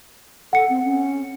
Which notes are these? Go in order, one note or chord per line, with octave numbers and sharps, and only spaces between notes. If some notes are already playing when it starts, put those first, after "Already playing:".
A4 F#5 C#7
C4
C#4